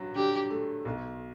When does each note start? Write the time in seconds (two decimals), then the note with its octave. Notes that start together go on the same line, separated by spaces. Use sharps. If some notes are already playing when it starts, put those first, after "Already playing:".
Already playing: G2 F#3
0.15 D3 G4
0.50 A3
0.85 B1